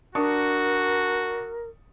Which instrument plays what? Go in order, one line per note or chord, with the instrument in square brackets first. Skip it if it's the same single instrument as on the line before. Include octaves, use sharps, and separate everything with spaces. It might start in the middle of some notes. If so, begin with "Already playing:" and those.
[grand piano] D4 C#6 D#6 [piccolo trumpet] F#4 [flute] A#4